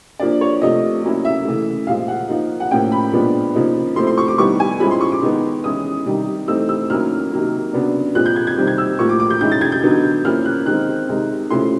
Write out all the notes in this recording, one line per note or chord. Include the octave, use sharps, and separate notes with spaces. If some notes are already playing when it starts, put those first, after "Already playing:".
F3 A#3 D4 D5
C#5
C3 F3 A3 D#5
F#3 A#3 C#4 E4
E5
C#3 E3 A3
A#2 F3 G#3 F5
F#5
F3 A#3 D#4
F#5
A2 F3 A#3 C#4 G5
B5
A#2 F3 G#3 B3 D4
C#3 F3 A#3 D#4
F3 A3 C4 E4 C6
C6
C#6
D6
D#3 G3 B3 E4 C#6
G#5
F3 G#3 C#4 E4 B5
C6
C#6
D6
D#3 G#3 B3
E3 G#3 C#4 E4 D#6
C3 D#3 G3
E3 A3 C4 D#4 E6
E6
D#3 F#3 A#3 C#4 E4 F6
C3 D#3 F#3 A#3
C#3 F#3 B3 D4
A#2 F3 G#3 C4 F#6
G6
G#6
G#6
C3 D#3 G3 C4
G#6
E6
A2 F3 A#3 C#6
D6
D6
G6
D#3 G#3 C#4 E4 G6
A6
G#6
G6
D3 F#3 B3 D#4
F3 A#3 C#4 E4 F6
F#6
D#3 G#3 C4 F#6
C3 D#3 G#3
C#3 F3 A3 C#4 E4 C6